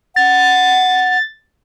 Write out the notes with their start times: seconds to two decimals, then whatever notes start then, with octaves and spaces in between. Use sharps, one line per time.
0.16 F#5 A6